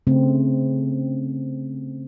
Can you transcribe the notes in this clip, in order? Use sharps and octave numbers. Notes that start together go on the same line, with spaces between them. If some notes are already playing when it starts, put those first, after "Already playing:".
C#3 A3 C4